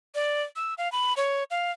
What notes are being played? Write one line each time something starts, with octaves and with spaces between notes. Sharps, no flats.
D5
E6
F5
B5
C#5
F5